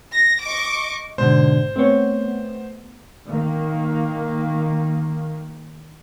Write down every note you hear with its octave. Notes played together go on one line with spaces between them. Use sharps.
A#6
D#5 C#6 D6
G#2 B2 D3 C5
A3 B3 C4 C#5
D#3 A#3